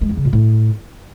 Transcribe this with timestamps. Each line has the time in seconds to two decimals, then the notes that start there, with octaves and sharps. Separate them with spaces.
0.01 G#3
0.09 E2
0.17 C#3
0.25 A#2
0.33 A2